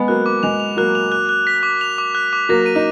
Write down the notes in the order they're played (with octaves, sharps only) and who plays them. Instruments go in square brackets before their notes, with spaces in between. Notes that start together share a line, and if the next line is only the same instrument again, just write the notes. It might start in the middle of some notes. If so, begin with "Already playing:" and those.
Already playing: [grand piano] G#3 B3
[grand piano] F#3 A#3 [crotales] F#6
[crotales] D6
[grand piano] G#3 [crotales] F7
[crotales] F7
[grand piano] F#3 A#3 [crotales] F#6
[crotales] F7
F#6
F#6
B6
D6
F7
D6
F#6
D6
[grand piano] F#3 A#3 [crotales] A#6
[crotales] D#7
[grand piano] D#4